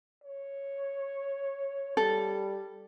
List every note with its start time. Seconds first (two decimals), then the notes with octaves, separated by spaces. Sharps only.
0.24 C#5
1.97 G3 A4